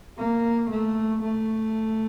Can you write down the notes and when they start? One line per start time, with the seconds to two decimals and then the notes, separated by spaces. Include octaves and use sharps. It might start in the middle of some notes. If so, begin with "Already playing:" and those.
0.18 A#3
0.71 A3
1.23 A3